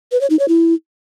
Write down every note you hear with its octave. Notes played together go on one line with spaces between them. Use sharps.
B4
C#5
D#4
C#5
E4